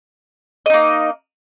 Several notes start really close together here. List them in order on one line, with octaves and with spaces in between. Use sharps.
D#5 D#4 A#3